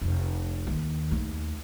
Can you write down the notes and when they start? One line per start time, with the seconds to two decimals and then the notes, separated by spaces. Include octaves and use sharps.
0.01 F1
0.67 D#2
1.11 D#2 A3